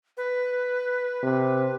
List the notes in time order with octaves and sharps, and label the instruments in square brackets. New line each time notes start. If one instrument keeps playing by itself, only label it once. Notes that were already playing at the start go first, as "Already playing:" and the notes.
[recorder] B4
[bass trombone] C3